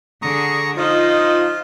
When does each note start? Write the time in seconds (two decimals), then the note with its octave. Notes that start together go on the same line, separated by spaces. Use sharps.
0.22 D3 G#4 A#5 C#6 D#6
0.77 F3 D#4 F4 D#5